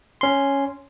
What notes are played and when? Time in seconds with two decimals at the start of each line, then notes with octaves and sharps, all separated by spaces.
0.21 C#4 C6